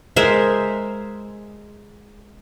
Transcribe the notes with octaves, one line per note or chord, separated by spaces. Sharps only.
G#3 A#4 C5 E5